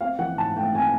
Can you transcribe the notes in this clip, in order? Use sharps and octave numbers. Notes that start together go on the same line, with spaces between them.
C4 F5
E3 F#5
G#2 A5
A3 G5
C4 G#5